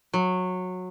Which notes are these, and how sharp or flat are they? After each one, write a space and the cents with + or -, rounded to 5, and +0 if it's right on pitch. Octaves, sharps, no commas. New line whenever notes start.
F#3 -15